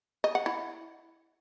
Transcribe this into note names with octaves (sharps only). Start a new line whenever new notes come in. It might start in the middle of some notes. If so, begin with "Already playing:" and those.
D#5
F#5
E4